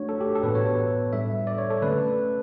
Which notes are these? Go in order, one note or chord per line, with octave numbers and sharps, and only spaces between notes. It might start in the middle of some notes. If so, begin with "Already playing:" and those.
Already playing: A3 D4 F#4 C#5
A4
G4
A4
A2 E3 B3 F#4 B4
C#5
A2 G3 D4 A4 E5
D5
C#5
A4
D3 A3 C#4 B4